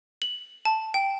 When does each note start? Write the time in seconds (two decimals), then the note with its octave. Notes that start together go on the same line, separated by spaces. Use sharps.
0.22 F#7
0.65 A5
0.94 G5